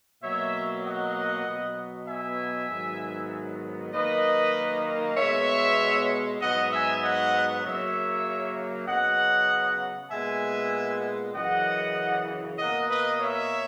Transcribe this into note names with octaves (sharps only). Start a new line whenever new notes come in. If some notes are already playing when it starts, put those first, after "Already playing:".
B2 F#3 A#3 C#5 E5
D#5 F#5
B2 F#3 B3
E5 G#5
G#2 D#3 F#3 B3
F#2 D#3 A#3 B4 D#5
B2 G#3 B3 C#5 E5
G#2 F#3 B3 D#5 F#5
E5 G#5
D#5 F#5
F#2 C#3 F#3 A#3 C#5 E5
C#3 F#3 B3 D#5 F#5
A#2 G#3 B3 E5 G#5
F#2 C#3 E3 D#5 F#5
B2 A#3 D#5 F#5
B4 D#5
C#5 E5